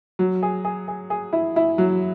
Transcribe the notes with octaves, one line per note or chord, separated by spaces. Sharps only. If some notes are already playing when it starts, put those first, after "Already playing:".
F#3
G#4
G#4
G#4
G#4
E4
E4
F#3